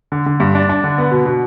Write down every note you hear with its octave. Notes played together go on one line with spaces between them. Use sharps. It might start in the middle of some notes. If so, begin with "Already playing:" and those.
D3
D3
G2
D4
D4
D3
B3
B2
B2